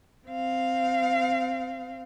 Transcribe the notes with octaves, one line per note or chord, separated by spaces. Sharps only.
C4 F5